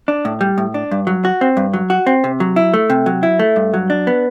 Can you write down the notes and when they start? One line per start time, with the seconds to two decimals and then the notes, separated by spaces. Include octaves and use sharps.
0.08 D4
0.25 A2
0.41 G3
0.58 A2
0.74 D4
0.91 G2
1.07 F#3
1.25 F#4
1.41 C4
1.57 G2
1.73 F#3
1.90 F#4
2.07 C4
2.24 C3
2.40 F#3
2.56 E4
2.74 A3
2.90 C3
3.06 F#3
3.23 E4
3.39 A3
3.56 G2
3.74 F#3
3.90 D4
4.07 B3